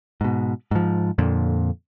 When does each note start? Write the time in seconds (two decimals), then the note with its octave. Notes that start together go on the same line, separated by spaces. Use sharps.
0.21 G#2 B2
0.71 G#2 F3
1.18 F2 A#2 D3